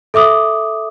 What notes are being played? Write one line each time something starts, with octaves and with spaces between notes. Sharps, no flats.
A4 E5 D6 D#6